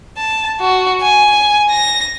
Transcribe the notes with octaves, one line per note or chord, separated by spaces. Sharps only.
A5
F#4
G#5
A#6